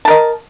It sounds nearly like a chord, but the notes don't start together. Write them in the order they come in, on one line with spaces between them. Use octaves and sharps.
A5 A#4 D#5